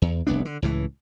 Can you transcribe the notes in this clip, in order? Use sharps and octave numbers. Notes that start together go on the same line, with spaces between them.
E2
F1 C2 B3 D4
D3
C#2 A2 E3